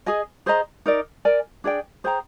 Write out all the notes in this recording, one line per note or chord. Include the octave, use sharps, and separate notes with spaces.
G#4 D#5 G#5
G#4 C5 D#5 A#5
D#4 A#4 D5
A#4 D5 G#5
D4 G#4 D5 G5
G#4 C5 G5 A#5